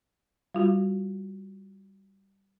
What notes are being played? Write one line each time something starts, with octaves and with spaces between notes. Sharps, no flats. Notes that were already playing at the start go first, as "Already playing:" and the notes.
G3 F4 F#4